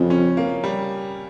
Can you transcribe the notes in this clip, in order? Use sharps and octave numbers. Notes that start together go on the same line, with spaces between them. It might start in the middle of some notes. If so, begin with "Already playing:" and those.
Already playing: F2 C#3 G3
C#4
A#3
G3